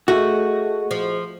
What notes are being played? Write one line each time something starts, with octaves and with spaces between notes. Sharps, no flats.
A3 F#4 G#4 D#5
F3